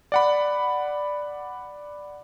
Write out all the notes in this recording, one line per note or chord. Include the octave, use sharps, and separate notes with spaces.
D5 F#5 B5